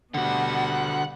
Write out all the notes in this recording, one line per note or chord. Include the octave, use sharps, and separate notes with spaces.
B2 D3 G3 F#4 F#5 A5